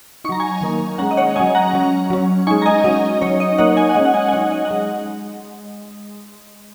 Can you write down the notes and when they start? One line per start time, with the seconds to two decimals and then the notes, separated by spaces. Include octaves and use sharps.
0.24 D#4 C#6
0.29 F#3 A#5
0.40 G#5 C#6
0.61 D#3 A#3 D#4
0.98 C#4 F#5 A#5
1.02 G#3
1.11 D#5
1.17 C#5 F#5
1.36 F#3 C#4 D#5 G#5
1.55 F#5 A#5
1.74 F#3 C#4
2.10 F#3 C#4
2.47 G#3 D#4 G#5 C#6
2.62 A#5
2.66 D#5 G#5
2.84 F#3 C#4 D#5
3.21 F#3 D#4 C#5
3.40 D#5
3.58 F#3 A#3 D#4 C#5 F#5
3.77 D#5 G#5
3.89 F#5
3.96 G#3 D#5 G#5
3.99 C#4
4.05 F#5
4.14 D#5 G#5
4.28 G#5
4.33 F#3 D#4 C#5 F#5
4.52 D#5
4.65 F#5
4.71 G#3